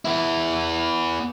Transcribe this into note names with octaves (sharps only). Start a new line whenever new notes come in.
B3 E4